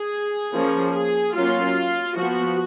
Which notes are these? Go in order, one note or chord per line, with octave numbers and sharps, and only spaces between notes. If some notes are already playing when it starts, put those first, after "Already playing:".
Already playing: G#4
F3 A#3 C#4
G#4
F#3 A#3 C#4 F4
F3 B3 F#4